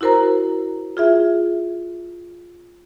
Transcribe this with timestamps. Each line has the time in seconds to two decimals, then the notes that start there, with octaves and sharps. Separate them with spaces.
0.01 E4 F#4 A#4 C5 A#5
0.97 F4 G#4 E5